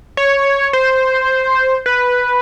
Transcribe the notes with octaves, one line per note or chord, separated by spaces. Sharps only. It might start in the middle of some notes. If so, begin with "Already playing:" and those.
C#5
C5
B4